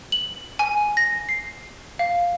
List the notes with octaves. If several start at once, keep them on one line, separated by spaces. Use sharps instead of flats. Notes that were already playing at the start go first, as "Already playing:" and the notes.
F#7
G#5
A#6
C7
F5